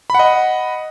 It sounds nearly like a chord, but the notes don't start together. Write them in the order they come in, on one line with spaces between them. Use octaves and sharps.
B5 F#5 D#5